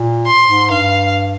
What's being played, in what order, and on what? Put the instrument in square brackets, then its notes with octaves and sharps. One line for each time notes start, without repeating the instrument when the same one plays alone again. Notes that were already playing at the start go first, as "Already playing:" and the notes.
Already playing: [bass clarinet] A#2
[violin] C6
[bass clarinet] G#2
[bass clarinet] G2 [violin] F5